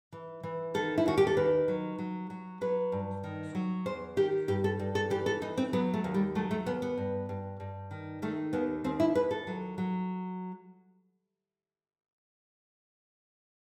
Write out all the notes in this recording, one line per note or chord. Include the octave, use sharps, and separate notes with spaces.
E3
E3
D#3 A4
E4
D#2 F#4
G4
A4
D#3 B4
F#3
F#3
F#3
F#3 B4
G2
D#3
F#3
E2 C5
D#3 G4
G2 G4
A4
G2
A4
E3 G4
A4
E3 D#4
C4
F#3 B3
A3
D#2
G3
F#3 A3
A3
D#2 B3
B3
G2
G2
G2
D#3
D#3 A3
D#2 B3
D#2 C4
E4
D#2 B4
A4
F#3
F#3